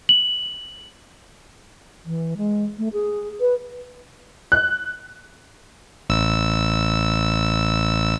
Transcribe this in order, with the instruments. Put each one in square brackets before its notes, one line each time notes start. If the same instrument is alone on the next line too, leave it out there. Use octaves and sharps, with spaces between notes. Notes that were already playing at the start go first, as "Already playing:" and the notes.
[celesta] F#7
[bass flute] E3
G#3
A3
G#4
B4
[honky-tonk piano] F#6
[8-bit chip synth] A1 E6